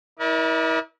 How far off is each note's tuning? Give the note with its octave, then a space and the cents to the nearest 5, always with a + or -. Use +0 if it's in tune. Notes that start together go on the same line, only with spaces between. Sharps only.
E4 -35 A#4 +40 D5 +20